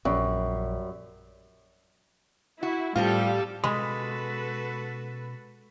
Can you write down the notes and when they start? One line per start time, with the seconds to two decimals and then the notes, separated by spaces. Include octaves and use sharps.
0.05 A#1 F#2 G3
2.63 E4 F#4
2.95 A2 F3 G3 C4 F4 A4 F5
3.64 B2 G#3 C#4 F#4 A4 B4 B5